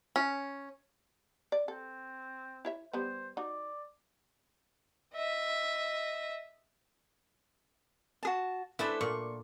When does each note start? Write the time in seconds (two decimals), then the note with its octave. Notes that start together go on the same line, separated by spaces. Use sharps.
0.16 C#4
1.52 D5
1.68 C4 A4
2.65 E4 C#5 E5
2.93 G3 B3 C5
3.37 D#4 F#4 D5
5.14 D#5 E5
8.23 F#4 G#4 A5
8.79 A3 D4 E4 A4 B4 C5
9.01 A#2 C#6